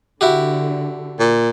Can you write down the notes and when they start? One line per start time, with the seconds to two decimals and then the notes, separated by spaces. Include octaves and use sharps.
0.21 D3 E4 F#4 G4
1.19 A#2